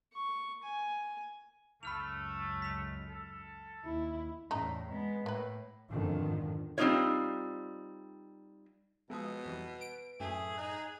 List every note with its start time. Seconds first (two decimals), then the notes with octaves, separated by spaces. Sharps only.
0.14 C#6
0.64 G#5
1.83 C#2 F#2 A3 B5 F6 F7
2.62 B6 F7
3.08 A4
3.85 D#2 E4
4.51 E2 A2 C#3 D#4 A#5
4.88 G#3 B3
5.26 A2 A#3 B4
5.90 F2 G#2 B2 D3 D#3 F3
6.78 G3 C4 C#4 D#4 F4 C#5
9.10 B2 F3 G#3 B3 D#6
9.45 F2 E3 G3 B4
9.81 D7
10.20 F#2 A2 A3 G#4
10.58 D#4 F#6 F7